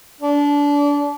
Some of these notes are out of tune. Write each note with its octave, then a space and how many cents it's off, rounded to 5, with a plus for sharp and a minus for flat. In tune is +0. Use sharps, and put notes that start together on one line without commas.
D4 -25